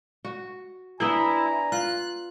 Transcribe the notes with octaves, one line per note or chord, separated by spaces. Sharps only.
F#4
B3 D4 E4 C5 G#5 A#5
F4 F#6